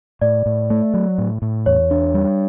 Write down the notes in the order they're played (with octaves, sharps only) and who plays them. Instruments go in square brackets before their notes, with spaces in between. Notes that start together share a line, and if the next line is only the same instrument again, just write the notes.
[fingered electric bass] A2 [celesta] D5
[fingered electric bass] A2
A3
F#3
A2
A2
[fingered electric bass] E2 [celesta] C#5
[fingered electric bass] D4
G3